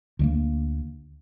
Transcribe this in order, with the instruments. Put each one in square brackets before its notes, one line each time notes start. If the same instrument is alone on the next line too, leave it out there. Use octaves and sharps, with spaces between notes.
[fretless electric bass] D2 G3 A#3